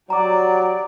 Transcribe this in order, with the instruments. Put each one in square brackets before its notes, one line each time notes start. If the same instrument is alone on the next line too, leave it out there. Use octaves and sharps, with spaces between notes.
[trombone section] F#3 [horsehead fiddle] G4 D5 [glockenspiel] A#5 D6